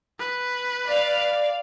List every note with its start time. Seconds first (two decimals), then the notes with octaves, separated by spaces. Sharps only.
0.20 B4
0.86 D5 F5